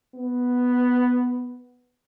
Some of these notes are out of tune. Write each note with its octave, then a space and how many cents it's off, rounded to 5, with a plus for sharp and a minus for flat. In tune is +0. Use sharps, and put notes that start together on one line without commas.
B3 +0